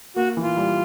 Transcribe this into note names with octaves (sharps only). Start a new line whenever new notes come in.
A#3 F#4
E3
F4
G3